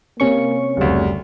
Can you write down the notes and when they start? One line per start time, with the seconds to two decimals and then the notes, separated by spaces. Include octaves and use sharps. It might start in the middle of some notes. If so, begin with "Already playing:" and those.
0.20 C3 A#3 C#4 C#6
0.77 F#1 D2 G3